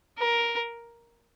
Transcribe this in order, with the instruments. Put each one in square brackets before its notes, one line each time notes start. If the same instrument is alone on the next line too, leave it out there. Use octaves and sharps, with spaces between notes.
[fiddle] A#4